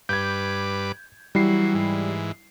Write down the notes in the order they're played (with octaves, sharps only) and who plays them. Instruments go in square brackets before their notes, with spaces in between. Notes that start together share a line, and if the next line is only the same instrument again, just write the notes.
[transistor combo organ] G2 B4 D6 [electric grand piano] G6 G#6
[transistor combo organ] E3 F#3 [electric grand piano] G3 E4 C7
[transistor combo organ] G#2 E3